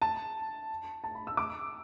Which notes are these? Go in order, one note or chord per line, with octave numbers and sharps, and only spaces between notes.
A5
A5
B5
E6
D6